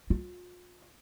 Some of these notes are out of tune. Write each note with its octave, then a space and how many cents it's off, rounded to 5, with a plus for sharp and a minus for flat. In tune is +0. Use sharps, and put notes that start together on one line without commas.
F4 +40